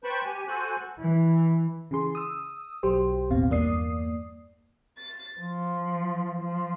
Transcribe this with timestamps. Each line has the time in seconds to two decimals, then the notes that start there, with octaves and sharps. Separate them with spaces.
0.04 B4 C5 G5 A5 B5 C#6
0.26 G4 G#5
0.47 F#4 A4 C5 G#5 F#6
0.99 E3
1.91 C#3 E3 G#4 C6
2.15 D#6 E6
2.83 B1 F#3 G4 C5
3.30 A1 D#2 B2 C4 F5
3.50 E2 G2 A#3 D5 D#6 C7
4.97 A6
5.41 F3
6.40 F3